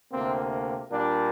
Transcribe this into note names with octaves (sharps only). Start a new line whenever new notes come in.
D2 C3 A#3 C4
A#2 G3 A#3 D4